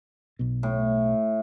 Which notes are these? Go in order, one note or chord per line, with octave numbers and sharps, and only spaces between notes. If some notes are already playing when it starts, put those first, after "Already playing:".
B1 B2
A2